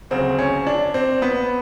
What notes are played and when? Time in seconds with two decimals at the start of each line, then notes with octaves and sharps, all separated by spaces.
0.11 D2 C#3 F#3 C4
0.39 C#4
0.67 D4
0.94 C4
1.22 B3